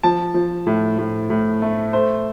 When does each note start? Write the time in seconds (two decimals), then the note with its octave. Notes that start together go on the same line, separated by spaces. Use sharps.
0.03 F3 A5
0.34 F3
0.67 A2
0.98 A2
1.30 A2
1.62 A3
1.93 A3 C5